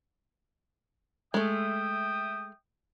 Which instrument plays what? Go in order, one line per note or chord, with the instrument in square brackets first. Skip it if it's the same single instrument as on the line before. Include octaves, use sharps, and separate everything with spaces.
[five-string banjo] G#3 A3 [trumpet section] E5 G5 D#6